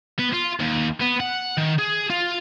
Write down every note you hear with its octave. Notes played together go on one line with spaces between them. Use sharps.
B3
F4
D#2
B3
F#5
D#3
G#4
F4